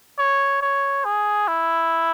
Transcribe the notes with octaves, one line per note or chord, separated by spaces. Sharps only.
C#5
C#5
G#4
E4